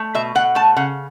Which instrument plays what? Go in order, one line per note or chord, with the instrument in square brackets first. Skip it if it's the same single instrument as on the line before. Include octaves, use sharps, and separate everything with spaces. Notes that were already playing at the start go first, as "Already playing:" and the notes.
Already playing: [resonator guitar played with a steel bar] A3
B2 E5
B2 F#5
A3 A5
C#3 F#5